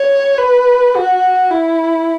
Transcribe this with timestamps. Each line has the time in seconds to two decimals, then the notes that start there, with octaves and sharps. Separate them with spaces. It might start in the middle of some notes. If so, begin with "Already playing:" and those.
Already playing: C#5
0.38 B4
0.95 F#4
1.51 E4